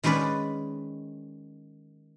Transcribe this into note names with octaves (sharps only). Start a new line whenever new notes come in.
D#3 G#3 C#4 B4 D5